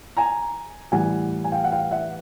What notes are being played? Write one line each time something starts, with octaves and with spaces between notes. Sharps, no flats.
G#5 A#5
A2 E3 G3 F#5 G#5
G#5
F5 G5
F#5
F5 G5
E5 F#5